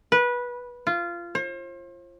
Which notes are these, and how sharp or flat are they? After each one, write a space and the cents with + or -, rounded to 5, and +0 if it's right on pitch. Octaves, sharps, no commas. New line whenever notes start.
B4 -20
F4 -20
C5 +40